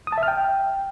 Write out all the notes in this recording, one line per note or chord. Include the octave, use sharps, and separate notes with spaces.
D#6
A5
E5
F6
G5